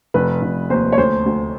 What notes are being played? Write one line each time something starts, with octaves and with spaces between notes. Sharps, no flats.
F1 B4
F1
D#2 C5
C#5
D2 C5
D2